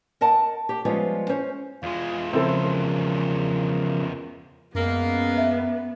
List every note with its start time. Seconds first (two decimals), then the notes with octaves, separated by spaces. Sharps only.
0.21 A#4 D#5 F#5 A5
0.69 G4
0.85 F3 G3 G#3 B3 C#4 F4
1.29 C#4 C5
1.83 E2 G#3 F4
2.33 C#3 F3 C4 E4 A4 A#4
4.75 F#2 G#3 A#3 B3
5.38 E5